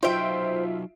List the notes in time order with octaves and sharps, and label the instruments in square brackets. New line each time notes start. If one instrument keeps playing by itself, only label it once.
[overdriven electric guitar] F#3 D#4 [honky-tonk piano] F4 E5 D7 [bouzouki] C5 G5